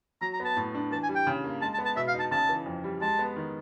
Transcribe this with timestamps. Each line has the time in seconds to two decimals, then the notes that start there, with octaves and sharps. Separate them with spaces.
0.21 F#3 A#5
0.33 A#5
0.40 B3 A5
0.57 A2
0.75 D4
0.91 E3 A5
1.03 G#5
1.09 G3
1.16 G5
1.27 C#3
1.44 A#3
1.62 G#3 A5
1.74 A5
1.78 B3
1.85 A5
1.96 B2 E5
2.08 F5
2.14 D#4
2.19 A5
2.31 C#3 A5
2.49 E3
2.66 F2
2.84 G3
3.01 G#3 A5
3.19 B3
3.36 D#3